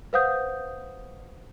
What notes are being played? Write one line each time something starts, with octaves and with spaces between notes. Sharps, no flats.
B4 C5 F5 F#5 D#6 G6